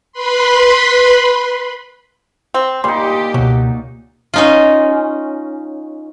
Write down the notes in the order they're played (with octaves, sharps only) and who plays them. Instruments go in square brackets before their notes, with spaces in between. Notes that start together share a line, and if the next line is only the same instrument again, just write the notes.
[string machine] B4 B5 C6
[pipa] C4
[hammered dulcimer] A#2 D#4 [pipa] G3 [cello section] G4 [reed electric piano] C6
[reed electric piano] C#2 B2 [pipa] F#3
[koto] C#4 D#4 F4